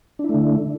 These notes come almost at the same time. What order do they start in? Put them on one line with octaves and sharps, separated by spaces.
D4 E4 A3 D3